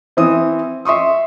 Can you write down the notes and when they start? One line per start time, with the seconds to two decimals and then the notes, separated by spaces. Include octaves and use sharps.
0.17 E3 C4 E5 D#6
0.85 E5 C6 C#6 D#6